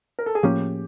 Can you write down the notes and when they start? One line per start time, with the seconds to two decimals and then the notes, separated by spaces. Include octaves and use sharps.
0.19 A#4
0.26 A4
0.35 G#4
0.43 A2 F3 A#3 C#4 G4